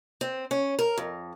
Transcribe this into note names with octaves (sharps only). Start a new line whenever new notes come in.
C4
C#4
A#4
F2